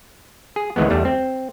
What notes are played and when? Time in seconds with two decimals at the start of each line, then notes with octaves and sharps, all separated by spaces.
0.56 G#4
0.76 D2 D#3 E3 G#3 B3
0.90 E2 G3 A3
1.05 C4